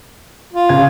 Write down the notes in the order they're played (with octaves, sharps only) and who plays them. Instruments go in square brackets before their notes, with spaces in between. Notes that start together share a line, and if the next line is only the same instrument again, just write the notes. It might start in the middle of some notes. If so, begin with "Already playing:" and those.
[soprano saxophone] F4
[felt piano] C#3 G#6